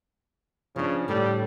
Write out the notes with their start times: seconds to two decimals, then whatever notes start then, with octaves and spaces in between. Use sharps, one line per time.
0.76 C#3 F3 D4
1.08 A2 D3 G3